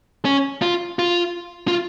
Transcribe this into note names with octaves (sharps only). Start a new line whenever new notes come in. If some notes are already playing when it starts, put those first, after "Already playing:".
C#4
F4
F4
F4